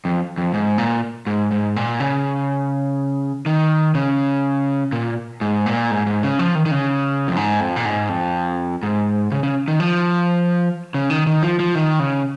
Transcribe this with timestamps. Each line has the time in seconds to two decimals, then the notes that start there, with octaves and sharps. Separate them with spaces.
0.05 F2
0.38 F2
0.54 G#2
0.78 A#2
1.27 G#2
1.52 G#2
1.76 A#2
2.00 C#3
3.46 D#3
3.95 C#3
4.92 A#2
5.41 G#2
5.66 A#2
5.91 G#2
6.07 G#2
6.23 C#3
6.39 F3
6.55 D#3
6.66 D#3
6.71 C#3
7.28 F2
7.36 G#2
7.60 F2
7.76 A#2
7.85 G#2
8.09 F2
8.83 G#2
9.32 C#3
9.43 C#3
9.68 D#3
9.80 F3
10.94 C#3
11.10 D#3
11.27 D#3
11.43 F3
11.60 F3
11.75 D#3
12.00 C#3